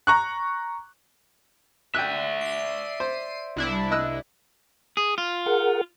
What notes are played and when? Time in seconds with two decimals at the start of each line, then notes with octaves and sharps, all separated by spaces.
0.07 A#5 C#6 F#6
1.95 D5 E5 G5 F#6
2.41 C7 D#7
3.00 C5
3.56 C2 D4 E4
3.91 D#5 E6 F#6
4.97 G#4
5.18 F4
5.46 G#4 A#4 F#5